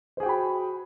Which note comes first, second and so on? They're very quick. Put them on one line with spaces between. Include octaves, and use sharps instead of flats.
C5 G#4 G5 F#4 B5